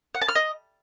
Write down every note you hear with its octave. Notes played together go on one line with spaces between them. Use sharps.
F#5
A5
F6
D#5